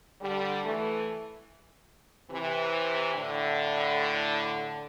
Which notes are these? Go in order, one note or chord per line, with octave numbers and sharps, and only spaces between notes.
D3 G3
E3 A3
C3 E3
A2 D3